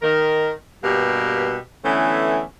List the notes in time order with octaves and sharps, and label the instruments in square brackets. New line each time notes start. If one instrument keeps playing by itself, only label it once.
[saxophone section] D#3 A#4
G2 B2 A#3 G4
D3 E3 A3 B3 C#4 E4